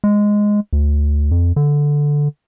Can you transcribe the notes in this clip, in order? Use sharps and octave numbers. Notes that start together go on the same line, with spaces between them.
G#3
D2
F2
D3